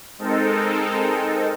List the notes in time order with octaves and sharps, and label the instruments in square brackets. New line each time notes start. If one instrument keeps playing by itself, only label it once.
[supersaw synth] G#3 C4 D#4 A4 A#4